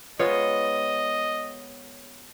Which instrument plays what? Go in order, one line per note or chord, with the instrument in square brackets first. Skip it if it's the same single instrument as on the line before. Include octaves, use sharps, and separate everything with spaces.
[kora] G#3 B3 F4 [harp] C#5 [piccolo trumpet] D#5